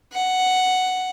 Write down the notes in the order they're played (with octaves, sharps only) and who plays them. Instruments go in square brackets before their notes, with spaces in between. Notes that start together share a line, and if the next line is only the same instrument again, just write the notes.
[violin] F#5